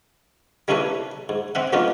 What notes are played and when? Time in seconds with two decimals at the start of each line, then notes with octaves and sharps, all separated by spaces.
0.68 G3 A#3 C#4 E4 A4 B4
1.29 G#2
1.55 C4 E5 F#5
1.73 F#3 A3 B3 C#4 D#4 F4